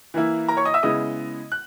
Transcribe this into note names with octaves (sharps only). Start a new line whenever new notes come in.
E3 A#3 E4
A#4 A#5
C#5 C#6
D#5 D#6
E5 E6
C#3 G#3 B3 E4 D#5 D#6
F#6